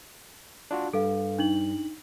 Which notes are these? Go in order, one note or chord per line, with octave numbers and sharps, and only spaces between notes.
D4 F4 F#4
G2 A4 F5
D4 D#4 F#7